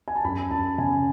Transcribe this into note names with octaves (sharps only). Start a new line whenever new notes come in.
G#5
A5
F#2 B5
F#2 A5
C#3 G#5